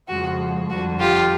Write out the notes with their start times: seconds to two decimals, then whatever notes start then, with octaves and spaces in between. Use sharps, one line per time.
0.08 F2 C#3 F3 G#3 F#4
0.69 F2 D3 G3 F#4
0.99 F4 G4